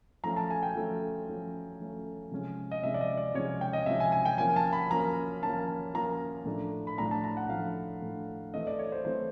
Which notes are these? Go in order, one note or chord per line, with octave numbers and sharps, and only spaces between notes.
F3 A3 C#4 A#5
A5
G#5
G5
F3 A3 C#4
F3 A3 C#4
F3 A3 C#4
C3 F3 G#3 C#4
D#5
C3 F3 G#3 C#4 E5
D5
D#5
D5
C3 F3 G#3 C#4 C#5
G5
D#5
C3 F3 G#3 C#4 E5
G#5
G#5
G5
F3 A#3 C#4 G#5
A5
B5
F3 A#3 C#4 A#5
F3 A#3 C#4 A5
F3 A#3 C#4 A#5
A2 F3 A3 D4
B5
A2 F3 A3 D4 A#5
A5
A#5
F#5
A2 F3 A3 D4 F5
A2 F3 A3 D4
E3 A3 C4 D#5
D5
C#5
C5
E3 A3 C4 C5